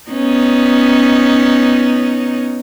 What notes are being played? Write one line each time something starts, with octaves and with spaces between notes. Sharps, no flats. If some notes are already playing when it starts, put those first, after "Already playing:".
B3 C#4 D#4